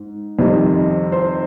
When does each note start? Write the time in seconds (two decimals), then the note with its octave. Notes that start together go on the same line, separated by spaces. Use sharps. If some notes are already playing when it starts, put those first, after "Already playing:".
Already playing: G#2
0.39 F2 C3 D#3 G3
1.12 C5